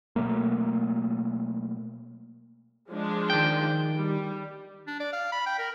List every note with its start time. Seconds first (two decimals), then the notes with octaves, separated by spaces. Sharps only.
0.16 B2 F#3 A3 A#3
2.89 F3 G#3 D4
3.30 D#3 G5
3.96 G3
4.87 D4
5.00 D5
5.13 F5
5.32 B5
5.46 G5
5.58 A#4